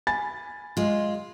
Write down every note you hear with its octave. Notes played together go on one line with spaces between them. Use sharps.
G#5 B5 A6
G#3 F4